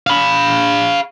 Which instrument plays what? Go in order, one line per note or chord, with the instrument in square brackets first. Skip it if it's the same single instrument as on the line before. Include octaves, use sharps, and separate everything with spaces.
[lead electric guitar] F5 B5